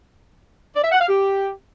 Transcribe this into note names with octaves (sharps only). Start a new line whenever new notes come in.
D5
E5
F#5
F5
G4